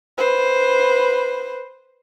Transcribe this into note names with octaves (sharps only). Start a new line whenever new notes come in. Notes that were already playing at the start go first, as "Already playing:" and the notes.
B4 C5